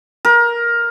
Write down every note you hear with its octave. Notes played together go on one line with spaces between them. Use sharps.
A#4